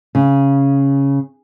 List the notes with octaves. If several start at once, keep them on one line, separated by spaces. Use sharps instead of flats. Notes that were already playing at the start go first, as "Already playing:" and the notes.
C#3